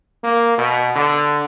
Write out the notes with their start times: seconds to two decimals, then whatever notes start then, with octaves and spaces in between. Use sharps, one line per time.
0.23 A#3
0.58 B2
0.96 D3